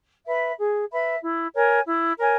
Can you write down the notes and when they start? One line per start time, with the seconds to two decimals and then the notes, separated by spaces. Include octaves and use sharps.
0.27 B4 E5 B5
0.58 G#4
0.91 B4 E5 B5
1.22 E4
1.54 A#4 C#5 G#5
1.86 E4
2.18 A#4 C#5 G#5